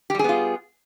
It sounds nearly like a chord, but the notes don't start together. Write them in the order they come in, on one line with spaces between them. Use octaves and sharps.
G4 G3 G#4 B3 F4